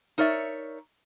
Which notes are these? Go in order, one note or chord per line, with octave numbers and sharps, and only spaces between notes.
D#4 A#4 C#5 D5 E5